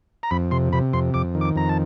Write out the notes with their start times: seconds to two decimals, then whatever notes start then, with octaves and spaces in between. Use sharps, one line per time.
0.23 A#5
0.31 F2 B5
0.51 C3 C6
0.73 C3 B5
0.93 F2 C6
1.14 F2 D6
1.35 D#3
1.41 D6
1.56 F2 A#5
1.69 A5